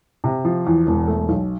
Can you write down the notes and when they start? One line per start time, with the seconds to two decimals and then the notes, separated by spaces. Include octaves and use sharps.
0.24 C3
0.45 F3
0.67 E2
0.87 E1
1.07 A3
1.29 B1